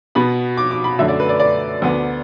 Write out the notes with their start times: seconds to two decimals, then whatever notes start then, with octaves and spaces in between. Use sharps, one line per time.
0.15 B2 B3 B5
0.57 D6
0.71 D6
0.84 B5
0.99 F#2 D3 A3 E5
1.08 D5
1.20 B4
1.29 D5
1.40 D5
1.82 D2 D3 B3